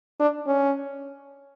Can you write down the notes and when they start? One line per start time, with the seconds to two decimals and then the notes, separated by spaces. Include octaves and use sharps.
0.20 D4
0.47 C#4